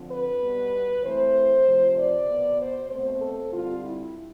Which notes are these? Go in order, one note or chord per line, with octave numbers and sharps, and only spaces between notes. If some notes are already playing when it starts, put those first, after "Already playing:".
Already playing: D3 F3 C4
B4
B2 G3 B3
E3 A3 C4 C5
C3 F3 A3 C4
D5
B2 B3
C5
B2 A3 C4 C5
A4
D3 G3 C4 F4
E4